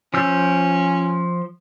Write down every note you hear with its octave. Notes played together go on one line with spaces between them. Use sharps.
F3 C#4 E6 G6